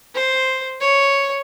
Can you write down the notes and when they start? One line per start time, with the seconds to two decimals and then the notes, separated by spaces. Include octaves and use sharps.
0.14 C5
0.80 C#5